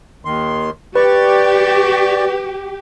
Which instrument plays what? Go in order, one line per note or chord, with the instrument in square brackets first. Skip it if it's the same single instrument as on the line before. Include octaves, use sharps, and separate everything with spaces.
[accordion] D#2 D#3 C6
[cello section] G4 [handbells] B4 [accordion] D5 C#6